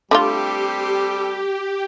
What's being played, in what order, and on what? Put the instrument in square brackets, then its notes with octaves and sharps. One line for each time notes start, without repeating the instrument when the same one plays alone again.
[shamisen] D3 A3 F4 [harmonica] G3 C4 A4 [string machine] G4